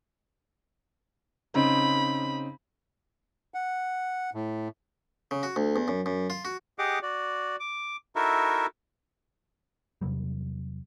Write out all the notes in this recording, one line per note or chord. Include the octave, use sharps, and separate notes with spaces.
C#3 C4 D#4 B5
F#5
A2
C#3
F#4
D2
E2
F#2
F#2
F4
F#4
G4 G#4 D#5 F#5 D6
F#4 D5
D6
D#4 E4 F#4 A4 A#4 E5
E2 C3 F#3 G3